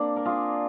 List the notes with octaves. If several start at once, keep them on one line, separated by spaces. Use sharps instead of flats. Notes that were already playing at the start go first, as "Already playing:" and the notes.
Already playing: A#3 C4 D4
A#4
F4 G#4